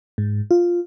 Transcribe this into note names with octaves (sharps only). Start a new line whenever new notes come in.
G#2
F4